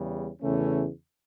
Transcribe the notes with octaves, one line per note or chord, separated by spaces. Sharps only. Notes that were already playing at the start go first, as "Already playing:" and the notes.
Already playing: E2 C#3 G3
E2 C#3 E3 A3 C#4